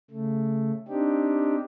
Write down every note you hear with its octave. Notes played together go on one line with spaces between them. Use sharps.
C#3 A3
C4 D4 D#4 G4